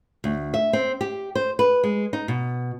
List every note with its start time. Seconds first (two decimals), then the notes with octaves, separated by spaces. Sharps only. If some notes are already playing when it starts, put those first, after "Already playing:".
0.24 D2
0.54 E5
0.73 C4
1.01 G4
1.35 C5
1.59 B4
1.84 G#3
2.13 D#4
2.28 B2